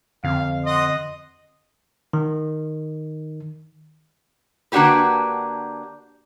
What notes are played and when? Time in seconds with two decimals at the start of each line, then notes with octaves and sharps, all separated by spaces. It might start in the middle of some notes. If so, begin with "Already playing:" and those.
0.24 F2 D3 C4 F5
0.66 D#5 F#5 C6 D#6
2.13 D#3
4.72 D3 A#3 D4 F#4 G4 B4